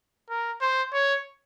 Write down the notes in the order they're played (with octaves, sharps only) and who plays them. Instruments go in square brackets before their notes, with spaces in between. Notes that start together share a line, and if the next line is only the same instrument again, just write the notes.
[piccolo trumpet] A#4
C5
C#5